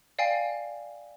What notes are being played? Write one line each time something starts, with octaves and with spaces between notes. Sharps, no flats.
D5 F5 G5 G#5 C7